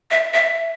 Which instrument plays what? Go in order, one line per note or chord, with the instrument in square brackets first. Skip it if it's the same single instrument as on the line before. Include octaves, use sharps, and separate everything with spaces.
[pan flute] E5
E5